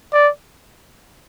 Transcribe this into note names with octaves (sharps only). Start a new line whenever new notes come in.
D5